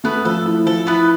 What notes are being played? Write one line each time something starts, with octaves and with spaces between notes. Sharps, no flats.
A3 B3 B4
F3 A4
E4
F3 A4
B3 E4 B4